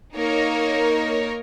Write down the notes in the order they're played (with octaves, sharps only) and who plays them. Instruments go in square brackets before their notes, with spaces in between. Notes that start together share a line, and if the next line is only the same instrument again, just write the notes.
[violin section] A#3 D#4 A#4 C#5